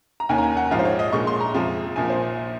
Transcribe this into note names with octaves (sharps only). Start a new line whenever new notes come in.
A#5
D#2 D#3 A#3 C#4 G#5
A#5
G#5
F#5
A#1 G#2 F3 F5
C5
C#5
D#5
A#1 A#2 G#3 C#6
C6
A#5
F2 C3 F3 G#3 C4
A#1 A#2 F3 G#5
C5